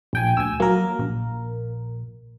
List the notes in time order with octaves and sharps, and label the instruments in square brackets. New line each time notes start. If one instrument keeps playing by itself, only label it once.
[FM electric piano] A#1 G5 G#5
[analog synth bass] D2 [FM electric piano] G#5 E6
[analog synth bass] F#3 [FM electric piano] A#3 A#4
[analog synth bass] A#1